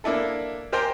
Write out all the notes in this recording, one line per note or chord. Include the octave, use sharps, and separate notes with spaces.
A#3 D4 E4 A4
G4 A#4 C5 G5 G#5 A#5